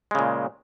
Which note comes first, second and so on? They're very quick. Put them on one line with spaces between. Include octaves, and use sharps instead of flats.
G#3 C#3 A#2